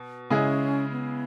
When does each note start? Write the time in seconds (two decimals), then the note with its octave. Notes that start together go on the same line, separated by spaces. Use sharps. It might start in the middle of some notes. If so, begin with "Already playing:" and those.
Already playing: B2
0.30 C#3 G#3 C#4 E4 G#4
0.91 B3